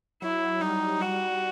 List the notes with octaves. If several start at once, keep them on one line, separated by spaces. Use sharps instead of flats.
F#3 E4
G3 D#4
G3 F#4